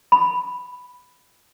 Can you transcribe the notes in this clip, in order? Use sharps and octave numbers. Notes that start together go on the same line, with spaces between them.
B5